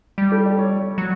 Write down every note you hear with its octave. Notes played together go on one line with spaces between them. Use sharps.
G3
A4
D5
C#5
F#3